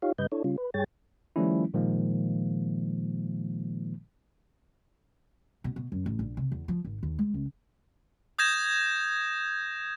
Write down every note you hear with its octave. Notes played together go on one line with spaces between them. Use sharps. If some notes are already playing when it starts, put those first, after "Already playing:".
D#4 F4 G4 C#5 F5
G2 C#3 G3 B4 D#5 G6
D4 E4 A4 C#5
C#3 G3 C#4 F4
B4
G2 G3 G#4 C#5 G5 A6
D#3 F3 G3 A3 C#4 E4
A#2 D#3 F3 G#3 A#3
B2
B2
F#2
A1
A#1
C3
E2
F3
G#1
D#2
G#3
C#2
D#6 G6 G#6 A#6 E7